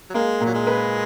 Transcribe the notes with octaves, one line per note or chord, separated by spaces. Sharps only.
F#3
G#3 A#3
A#2 F#3
G#3
B4